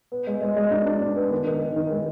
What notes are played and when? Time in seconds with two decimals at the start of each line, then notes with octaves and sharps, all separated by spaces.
0.12 B3
0.27 G#3
0.42 G#3
0.57 G#3
0.71 D4
0.86 D4
1.02 D4
1.16 B3
1.31 D#3
1.47 D#3
1.62 D#3
1.76 D#3
1.91 G#3